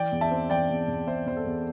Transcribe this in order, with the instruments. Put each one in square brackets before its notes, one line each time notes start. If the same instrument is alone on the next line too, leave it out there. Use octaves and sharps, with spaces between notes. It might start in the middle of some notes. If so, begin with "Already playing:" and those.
Already playing: [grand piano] E3 D5 G5
E2
E5 A5
C4
E3 D5 G5
E2
E2
E2 C5 E5
E2 C5
A4
E2